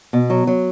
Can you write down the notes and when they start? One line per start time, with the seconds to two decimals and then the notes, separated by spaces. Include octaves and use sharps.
0.13 B2
0.30 F#3
0.47 F#3